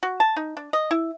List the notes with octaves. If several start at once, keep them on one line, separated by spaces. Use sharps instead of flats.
F#4
A5
D#4
D4
D#5
E4